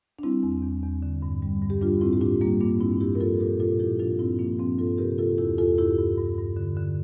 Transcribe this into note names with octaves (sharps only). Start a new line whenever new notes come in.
D4
G3 C4 E4
E2
E2
E2
D3
G2
G3
G2
G4
G3 D4 F4
A2 C4 E4
G4
A2 D4 F4
G3 A#3 D4
G2 A#3 D4
G2 C4 E4
G2 E4 G4
A#4
F3 F4 A4
A#2 G4 A#4
A#2 F4 A4
F3 E4 G4
F3 D4 F4
G2 C4 E4
F3 A#3 D4
F3 C4
G2 F4 A4
C3 G4 A#4
C3 F4 A4
E2 E4 G4
E2 F4 A4
G2 E4 G4
G2
G2
G2
D3
D3